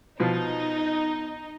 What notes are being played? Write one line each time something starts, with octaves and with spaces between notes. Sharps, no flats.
B2 F3 D#4